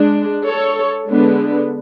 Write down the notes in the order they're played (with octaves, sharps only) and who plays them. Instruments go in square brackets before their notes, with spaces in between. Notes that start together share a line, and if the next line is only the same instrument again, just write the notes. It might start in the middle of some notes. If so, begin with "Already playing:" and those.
Already playing: [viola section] G#3 D4
A4 C#5
D3 G#3 B3 D4